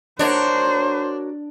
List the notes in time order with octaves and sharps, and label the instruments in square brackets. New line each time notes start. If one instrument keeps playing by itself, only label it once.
[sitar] D4 [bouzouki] F#4 A#4 C#5 [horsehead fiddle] C5